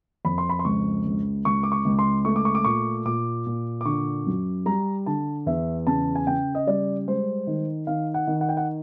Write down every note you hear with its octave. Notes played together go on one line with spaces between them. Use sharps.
F2 B5
C6
B5
C6
C#2 C#6
C#2
C#2 C#6
D6
C#6
C#2
C6
A3 C#6
D6
C#6
D6
A#2 C#6
A#2 D6
A#2
D6
D3 C#6
F#2
G3 A#5
D3 A5
E2 E5
C#3 A5
G#5
C#3 G5
D#5
G3 D5
G#3 C5
D#3
D#3 F5
F#5
D#3
F#5
G5
F#5